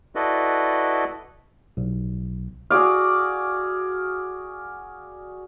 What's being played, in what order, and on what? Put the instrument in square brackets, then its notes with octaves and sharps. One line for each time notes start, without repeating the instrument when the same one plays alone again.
[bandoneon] E4 F#4 A4 B4 D5 D#5
[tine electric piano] B1
[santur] F#4 G#4 D5 F5